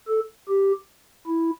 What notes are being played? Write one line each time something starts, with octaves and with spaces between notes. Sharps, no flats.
A4
G4
E4